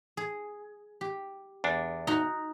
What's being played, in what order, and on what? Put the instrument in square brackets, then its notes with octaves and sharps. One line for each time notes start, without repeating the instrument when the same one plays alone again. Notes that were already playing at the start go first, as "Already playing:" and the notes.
[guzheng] G#4
G4
[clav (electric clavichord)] E2 D4
[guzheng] D#4 F#4